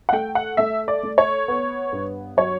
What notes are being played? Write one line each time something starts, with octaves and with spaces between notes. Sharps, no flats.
F#5
A3 G5
F#5
A3 E5
D5
A3
C#5
B3
G2
F#3 C#5